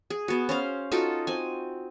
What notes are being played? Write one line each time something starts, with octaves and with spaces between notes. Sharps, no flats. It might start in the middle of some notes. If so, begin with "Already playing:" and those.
G#4
B3 F#4
C#4 C5 F5
D#4 F4 F#4 A4
C4 G#5